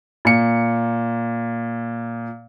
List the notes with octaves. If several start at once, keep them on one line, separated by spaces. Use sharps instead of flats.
A#2 C#7